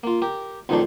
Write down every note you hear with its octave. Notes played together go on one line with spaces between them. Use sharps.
A#3 F4
G4 A#4
B1 F2 D#3 A3 D4 C6